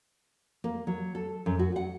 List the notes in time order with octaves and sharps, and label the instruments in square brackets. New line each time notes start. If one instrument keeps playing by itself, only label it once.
[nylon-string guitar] A#3
F#3
A4
F#2
F#4
F#5